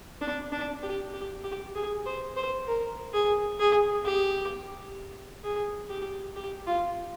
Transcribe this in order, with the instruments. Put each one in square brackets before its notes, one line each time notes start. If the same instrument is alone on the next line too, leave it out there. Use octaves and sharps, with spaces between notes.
[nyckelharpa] D4
D4
G4
G4
G4
G#4
C5
C5
A#4
G#4
G#4
G4
G#4
G4
G4
F4